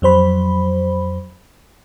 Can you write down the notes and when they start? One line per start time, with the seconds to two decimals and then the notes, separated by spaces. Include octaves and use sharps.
0.02 F2 F#3 C5 B5